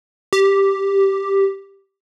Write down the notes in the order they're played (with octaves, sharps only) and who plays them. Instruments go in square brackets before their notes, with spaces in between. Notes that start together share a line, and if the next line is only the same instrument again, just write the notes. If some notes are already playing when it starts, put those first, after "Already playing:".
[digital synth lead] G4